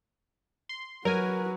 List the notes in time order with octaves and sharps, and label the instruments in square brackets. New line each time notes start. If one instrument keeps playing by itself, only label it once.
[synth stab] C6
[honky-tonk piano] F#3 [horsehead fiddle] F#4 B4 [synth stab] A#4 G#5